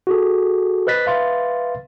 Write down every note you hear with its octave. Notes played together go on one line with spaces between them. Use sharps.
F#4 G#4 A4
B4 C5 D#5 F#6 A6 B6
B4 E5 F5 C6 A6